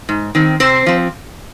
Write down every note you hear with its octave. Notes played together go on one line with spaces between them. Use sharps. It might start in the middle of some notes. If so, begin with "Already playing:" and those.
G#2
D#3 C4
C3 C4 C5
F3 C4